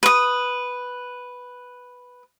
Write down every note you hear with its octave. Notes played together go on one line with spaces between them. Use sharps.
B4 D#6